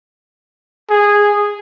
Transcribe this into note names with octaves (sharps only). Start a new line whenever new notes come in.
G#4